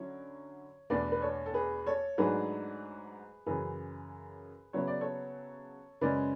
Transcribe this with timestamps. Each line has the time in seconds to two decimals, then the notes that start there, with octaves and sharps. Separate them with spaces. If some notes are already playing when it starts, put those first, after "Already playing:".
Already playing: D3 F#3 C#4 E4 C#5
0.90 E2 B2 A3 D4 B4 D5
1.12 B4
1.22 A4 C#5
1.46 A4
1.54 G#4 B4
1.86 A4 C#5
2.18 G#2 F#3 A3 D4 G#4 B4
3.46 F#2 C#3 E3 G#4 B4
4.73 C#3 F#3 B3 E4 C#5
4.87 D5
5.01 A4 C#5
6.01 F#2 C#3 G#3 C#4 B4 D5